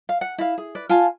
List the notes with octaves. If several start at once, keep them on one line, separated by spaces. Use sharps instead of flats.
F5
F#5
E4 F5
G#4
B4 D5
F4 F5 G#5 A5